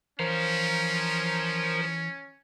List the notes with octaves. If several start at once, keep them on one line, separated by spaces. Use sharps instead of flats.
E3 F3 C#4 A#4 C5 F5